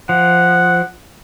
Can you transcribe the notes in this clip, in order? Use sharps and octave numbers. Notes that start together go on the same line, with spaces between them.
F3 F#5